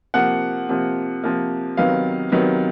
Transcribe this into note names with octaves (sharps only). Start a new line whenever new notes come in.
C3 F3 A#3 F#5
C3 F3 A#3
C3 F3 A#3
C3 D#3 F#3 B3 F5
C3 D#3 F#3 B3